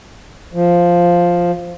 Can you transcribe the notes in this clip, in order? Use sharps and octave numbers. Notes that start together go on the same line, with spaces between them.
F3